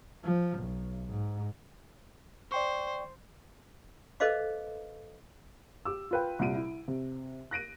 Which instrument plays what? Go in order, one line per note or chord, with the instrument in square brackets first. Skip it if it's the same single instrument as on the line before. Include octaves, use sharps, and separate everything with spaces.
[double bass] F3
B1
G#2
[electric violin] C5 [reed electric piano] D5 G5 C#6
[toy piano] A4 B4 C5 D#5 F5 D6
[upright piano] G4 D6 E6
F4 B4 G5
C2 A#2 G3 D7 D#7
E4
C3
F#6 A#6 D7 D#7